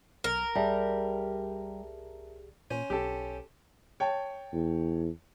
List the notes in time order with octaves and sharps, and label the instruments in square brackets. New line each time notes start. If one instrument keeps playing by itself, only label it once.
[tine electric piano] B1 [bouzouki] A#4
[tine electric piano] C2 G4 G#4 [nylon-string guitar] G3 [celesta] E5 A5
[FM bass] A#2 [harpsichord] C#4 C5
[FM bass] B1 [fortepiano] G4 A4
[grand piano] C#5 G5 A5
[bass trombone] E2